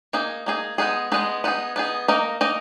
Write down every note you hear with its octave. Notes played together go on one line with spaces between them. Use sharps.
A#3 D#4 G#4
A#3 D#4 G#4
G#3 B3 D#4 G#4
G#3 B3 D#4 G#4
B3 D#4 G#4
B3 D#4 G#4
A#3 D#4 A#4 D#5
A#3 D#4 A#4 D#5